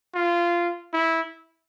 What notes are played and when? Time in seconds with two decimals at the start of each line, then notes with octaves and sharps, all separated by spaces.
0.14 F4
0.94 E4